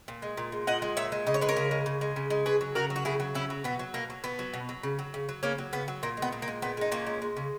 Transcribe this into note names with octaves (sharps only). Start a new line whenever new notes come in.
A#2
G#3
A#2
G#3
A#2 D#5 F#5
G#3
A#2 C#5 E5
G#3
C#3 D#5
C#5
G#3 B4
A#4 C#5
C#3
G#3
C#3
G#3
C#3
G#3
C#3 G#4 B4
F#3
C#3 F#4 A#4
F#3
F#4
C#3 E4 G#4
F#3
C#3 C#4 E4
F#3
B2 B3
F#3
B2 A#3
F#3
B2 B3
F#3
B2
F#3
C#3
F#3
C#3
F#3
C#3 A#3 C#4
F#3
C#3 B3
F#3
A#2 A#3
G#3
B3
A#2
A#3
G#3
A#2 B3
G#3 D#4
A#2 A#3 C#4
G#3
G#3
C#3